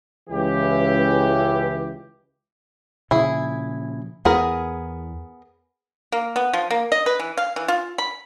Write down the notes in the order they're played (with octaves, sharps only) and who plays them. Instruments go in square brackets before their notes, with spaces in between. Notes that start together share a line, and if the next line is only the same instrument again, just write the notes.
[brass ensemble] C#2 E3 G4
[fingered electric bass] A#2 C#3 F3 [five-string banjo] E4 G#4
[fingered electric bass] E2 [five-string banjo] B3 G#4 A#4
[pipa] A#3
B3
F3
A#3
D#5
B4
E3
F5
E3
F4
B5